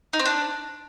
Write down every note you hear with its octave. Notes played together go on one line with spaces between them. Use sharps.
D#4
C4
D4